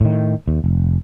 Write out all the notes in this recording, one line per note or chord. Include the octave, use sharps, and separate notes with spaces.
A2 D#3
D#2
F1